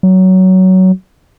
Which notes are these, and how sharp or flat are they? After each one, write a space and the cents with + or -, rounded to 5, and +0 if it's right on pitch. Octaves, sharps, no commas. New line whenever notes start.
F#3 +15